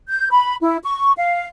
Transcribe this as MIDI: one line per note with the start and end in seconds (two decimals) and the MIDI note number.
0.08 0.29 91
0.30 0.55 83
0.61 0.77 64
0.84 1.13 85
1.17 1.46 77